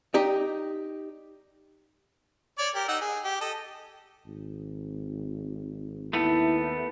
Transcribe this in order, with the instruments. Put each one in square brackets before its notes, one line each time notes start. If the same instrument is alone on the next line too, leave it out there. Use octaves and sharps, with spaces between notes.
[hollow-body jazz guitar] D#4 G4 D5
[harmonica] C#5 D5
G4 A#4
D#4 F#5 E6
G#4
G4
A4 D#5
[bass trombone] G#1
[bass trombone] D#2 [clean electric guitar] A3 B3 [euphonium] E4